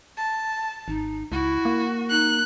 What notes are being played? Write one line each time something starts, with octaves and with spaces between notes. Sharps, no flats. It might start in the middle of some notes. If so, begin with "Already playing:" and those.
A5
G#1 D#4
C#2 E4 F#4
A#3
D#4 F#6